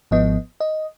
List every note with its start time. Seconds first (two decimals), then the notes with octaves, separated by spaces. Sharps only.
0.11 G#1 G#2 F3 B3 D#5
0.60 D#5